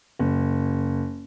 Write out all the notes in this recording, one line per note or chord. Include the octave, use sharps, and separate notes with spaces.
F#1